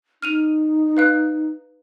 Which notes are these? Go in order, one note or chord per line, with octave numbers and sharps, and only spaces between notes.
D#4 F6 D#7 F7
B4 F5 F#6